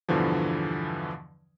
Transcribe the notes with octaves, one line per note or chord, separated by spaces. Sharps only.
E2 G2 B2 D3 E3 F3